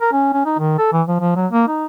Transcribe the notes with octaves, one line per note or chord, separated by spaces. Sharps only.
A#4
C#4
C#4
D#4
D#3
A4
E3
F3
F3
F#3
A#3
D#4